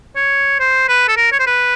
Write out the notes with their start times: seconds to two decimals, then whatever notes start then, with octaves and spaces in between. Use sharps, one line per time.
0.16 C#5
0.60 C5
0.89 B4
1.08 A4
1.17 A#4
1.32 C#5
1.40 C5
1.47 B4